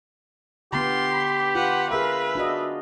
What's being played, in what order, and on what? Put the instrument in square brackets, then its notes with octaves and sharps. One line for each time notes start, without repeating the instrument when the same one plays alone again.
[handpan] D3 B3 [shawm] F4 [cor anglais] G4 [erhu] C6
[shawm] B5
[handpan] F4 [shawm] B4 [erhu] F#5
[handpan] G#4 A#4 F5 [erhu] B4 [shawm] E5
[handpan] D4 F#4 D#5